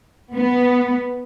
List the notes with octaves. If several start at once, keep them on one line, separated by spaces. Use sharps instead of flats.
B3